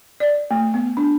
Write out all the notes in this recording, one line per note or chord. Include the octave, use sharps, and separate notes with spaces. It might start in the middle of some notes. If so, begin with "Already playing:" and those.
D5
A3
B3
D4